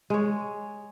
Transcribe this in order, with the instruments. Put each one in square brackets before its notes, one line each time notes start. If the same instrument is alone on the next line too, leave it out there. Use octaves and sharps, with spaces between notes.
[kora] G#3 C#5